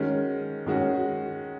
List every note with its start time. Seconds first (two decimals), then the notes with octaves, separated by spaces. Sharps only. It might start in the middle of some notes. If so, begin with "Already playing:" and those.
Already playing: D#3 G#3 C#4 F#4
0.66 D#3 G#3 C#4 F#4